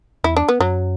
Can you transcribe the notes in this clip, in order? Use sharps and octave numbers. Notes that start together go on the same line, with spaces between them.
E2 E4
D4
B3
F#2 F#3